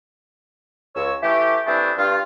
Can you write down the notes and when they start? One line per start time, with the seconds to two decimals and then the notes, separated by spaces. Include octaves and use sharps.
0.95 C#2 C#5 E6
1.22 E3 A3 G4
1.66 E3 G3 A3 B3 C4 D4
1.97 G2 F4